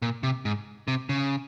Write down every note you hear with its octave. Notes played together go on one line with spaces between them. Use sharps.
A#2
C3
G#2
C3
C#3